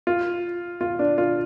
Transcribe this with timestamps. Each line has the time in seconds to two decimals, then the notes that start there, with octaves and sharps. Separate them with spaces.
0.07 F4
0.81 F4
0.99 D4
1.18 F4